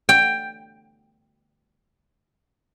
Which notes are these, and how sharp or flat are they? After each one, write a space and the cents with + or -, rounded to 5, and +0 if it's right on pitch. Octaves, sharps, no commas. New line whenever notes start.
G5 +10